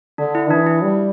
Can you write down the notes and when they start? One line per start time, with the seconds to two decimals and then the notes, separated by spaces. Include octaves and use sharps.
0.18 D3 D4
0.35 E4
0.50 E3 D4
0.66 E4
0.82 G3